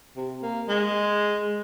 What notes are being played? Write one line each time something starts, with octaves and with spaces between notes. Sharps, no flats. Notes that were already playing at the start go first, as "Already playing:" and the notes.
C3
A#3
G#3